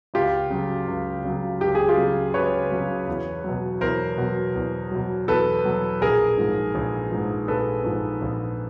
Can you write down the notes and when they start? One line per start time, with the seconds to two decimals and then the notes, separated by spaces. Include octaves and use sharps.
0.14 C#2 F4 G4
0.50 C#3 F#3
0.88 C#2
1.24 C#3 F#3
1.61 C#2 G4
1.75 G#4
1.88 F4 G4
1.98 C#3 F#3
2.34 C#2 B4 C#5
2.71 C#3 F#3
3.08 E2
3.44 B2 F#3
3.81 E2 A#4 C5
4.17 B2 F#3
4.55 E2
4.91 B2 F#3
5.28 E2 A4 B4
5.65 B2 F#3
6.02 A#1 G#4 A#4
6.37 G#2 F3
6.75 A#1
7.12 G#2 F3
7.48 A#1 A4 B4
7.84 G#2 F3
8.22 A#1